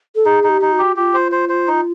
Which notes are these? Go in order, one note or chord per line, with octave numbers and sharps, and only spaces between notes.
A4
D#4 G#4
D#4
G4
D#4
F#4
G4
F4 G4
C5
C5
C5
D#4